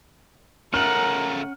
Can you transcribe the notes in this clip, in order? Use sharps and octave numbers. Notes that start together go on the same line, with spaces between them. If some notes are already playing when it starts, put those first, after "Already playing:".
C#3 A3 C#4 A#4 F#5 F6